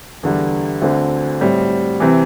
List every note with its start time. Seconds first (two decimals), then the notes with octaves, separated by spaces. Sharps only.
0.23 E2 D3 G3
0.82 D2 D3 C4
1.41 A2 G3 C4
2.00 C3 E3